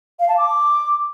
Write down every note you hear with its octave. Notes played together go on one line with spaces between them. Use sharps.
F5
A5
D6